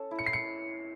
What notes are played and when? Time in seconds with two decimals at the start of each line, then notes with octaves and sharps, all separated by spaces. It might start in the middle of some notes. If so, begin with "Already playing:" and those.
Already playing: C#4 A4
0.11 E4
0.19 C#7
0.26 C7
0.33 C#7